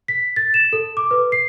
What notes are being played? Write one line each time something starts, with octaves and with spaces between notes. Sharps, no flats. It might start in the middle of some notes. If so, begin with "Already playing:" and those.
B6
A6
E7
A4
D6
B4
C7